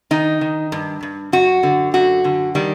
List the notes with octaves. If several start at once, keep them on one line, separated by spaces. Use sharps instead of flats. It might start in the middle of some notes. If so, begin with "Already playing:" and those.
D#3 D#4
D#3
G2
G2
F#2 F#4
D3
F#2 F#4
D3
D#3 G3